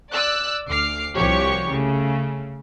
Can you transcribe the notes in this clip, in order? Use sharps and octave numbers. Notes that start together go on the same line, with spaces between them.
D5 E6 F#6
D2 D6 F6 C7
C2 F3 F#4 G4 C#5 C#6
C#3 A3